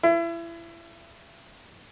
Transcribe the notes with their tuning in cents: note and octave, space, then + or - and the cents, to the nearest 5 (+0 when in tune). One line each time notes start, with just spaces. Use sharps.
E4 +30